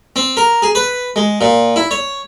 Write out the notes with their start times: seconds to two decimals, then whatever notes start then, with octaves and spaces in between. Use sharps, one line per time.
0.16 C4
0.37 A#4
0.62 G#4
0.75 B4
1.16 G#3
1.41 A#2
1.76 E4
1.91 C#5